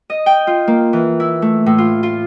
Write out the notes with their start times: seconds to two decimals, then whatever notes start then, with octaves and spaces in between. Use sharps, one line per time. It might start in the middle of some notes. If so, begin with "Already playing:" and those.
0.10 D#5
0.26 G5
0.47 F4
0.68 A#3
0.93 E3
1.20 E4
1.42 A3
1.66 A2
1.78 F4
2.03 F4